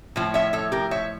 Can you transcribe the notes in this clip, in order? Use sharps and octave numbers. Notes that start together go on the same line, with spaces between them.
A2 F3
C#5 E5
A4 C#5
G4 A#4
C#5 E5